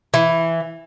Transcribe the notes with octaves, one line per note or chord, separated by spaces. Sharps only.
E3